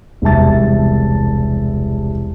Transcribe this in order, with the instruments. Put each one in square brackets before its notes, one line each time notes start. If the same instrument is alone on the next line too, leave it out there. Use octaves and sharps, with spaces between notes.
[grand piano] E1 C2 E5 A5 A6